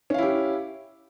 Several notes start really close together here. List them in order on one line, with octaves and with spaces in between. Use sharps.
C#4 F5 E4 G4